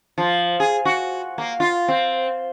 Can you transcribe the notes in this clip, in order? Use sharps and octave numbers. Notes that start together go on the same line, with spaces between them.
F3
G#4
F#4
A#3
F4
C4